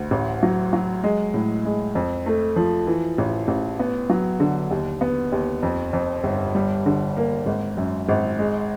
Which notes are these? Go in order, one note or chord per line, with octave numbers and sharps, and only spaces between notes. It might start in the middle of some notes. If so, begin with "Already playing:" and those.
Already playing: D2
A1
F#3
F#3
G#3
A2
G#3
F2
A3
F3
E3
A1
A1
B3
F#3
D3
D#2
B3
D#2
F2
F2
G1
G3
D3
A#3
G#1
F#2
G#1
G#3